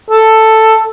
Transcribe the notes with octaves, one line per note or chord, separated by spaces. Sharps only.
A4